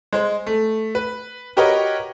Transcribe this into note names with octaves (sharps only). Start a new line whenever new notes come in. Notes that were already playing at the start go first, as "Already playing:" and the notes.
G#3 C5
A3
B4
F#4 G4 A#4 B4 C#5 D#5